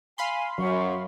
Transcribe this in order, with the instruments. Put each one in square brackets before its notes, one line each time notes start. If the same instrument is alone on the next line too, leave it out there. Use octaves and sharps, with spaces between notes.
[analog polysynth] F5 B5 C6 [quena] G#5
[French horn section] F#2 [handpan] F#3 [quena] C#6